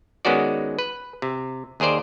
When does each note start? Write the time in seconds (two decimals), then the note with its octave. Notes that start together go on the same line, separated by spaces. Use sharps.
0.25 D#3 G#3 B3 C#4 F#4 D5
0.79 B4
1.22 C3
1.80 D#2 G#4 A#4 C5 D5